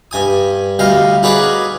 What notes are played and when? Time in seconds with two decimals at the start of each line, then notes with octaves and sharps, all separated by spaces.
0.11 G2 G#5 D#6
0.79 D2 G3 D#5 F5
1.23 D#4 F#4 G#4 B4 C#5 D5